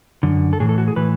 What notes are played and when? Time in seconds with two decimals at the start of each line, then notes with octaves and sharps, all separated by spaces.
0.23 F#2 D3
0.53 A4
0.60 A2 E3 G#4
0.69 A4
0.78 F#4
0.88 G#4
0.96 A2 E3 B4